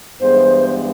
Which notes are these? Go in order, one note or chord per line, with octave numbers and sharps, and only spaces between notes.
G2 E3 G#3 B3 C5